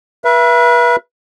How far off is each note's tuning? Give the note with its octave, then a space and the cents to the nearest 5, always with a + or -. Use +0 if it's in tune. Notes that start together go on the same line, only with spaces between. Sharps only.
B4 -35 E5 +30